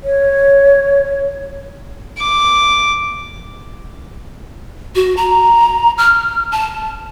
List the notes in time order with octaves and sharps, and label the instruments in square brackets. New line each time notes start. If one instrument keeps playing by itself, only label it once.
[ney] C#5
[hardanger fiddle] D6
[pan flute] F#4
A#5
F6
A5